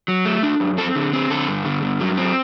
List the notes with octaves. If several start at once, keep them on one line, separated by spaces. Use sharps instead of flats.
F#3
A3
D4
F#2
C4 A4
D3
C4
D3 A4
G2
D3
G2
F#3
C4